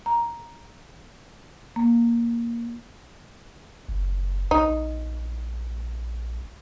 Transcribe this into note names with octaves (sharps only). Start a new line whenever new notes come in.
A#5
A#3
F#1
A#1 D#4